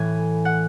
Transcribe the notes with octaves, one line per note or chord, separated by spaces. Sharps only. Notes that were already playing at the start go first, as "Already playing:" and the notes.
Already playing: A2 E3 G#5
F#5